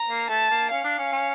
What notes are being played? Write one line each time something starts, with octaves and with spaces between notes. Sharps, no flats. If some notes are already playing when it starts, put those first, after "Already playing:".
Already playing: A#5
A#3
A3 A5
A#3
C#4 F5
D4
C#4
C#4